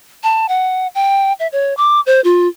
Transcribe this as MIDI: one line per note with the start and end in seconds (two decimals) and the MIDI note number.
0.23 0.46 81
0.49 0.88 78
0.95 1.33 79
1.40 1.47 76
1.52 1.76 73
1.77 2.00 86
2.06 2.21 72
2.24 2.48 65